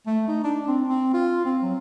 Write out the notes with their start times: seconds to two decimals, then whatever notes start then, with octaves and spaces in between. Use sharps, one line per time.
0.07 A3
0.28 D#4
0.44 D4
0.68 C4
0.88 C4
1.13 F4
1.45 C4
1.62 F#3